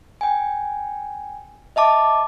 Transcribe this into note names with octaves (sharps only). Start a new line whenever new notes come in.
G5 G#5
D#5 E5 A5 D6